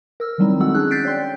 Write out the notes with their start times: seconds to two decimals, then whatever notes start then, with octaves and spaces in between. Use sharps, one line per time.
0.20 A#4 E6 F6
0.38 D#3 F#3 G3 C4 D#4 E4
0.60 G#3 F#4 A4 F#5 E6
0.75 C#4 D4 G#4 F#6
0.91 F#6 G6 A6 B6 C7 D7
1.05 C#5 D5 G5 C6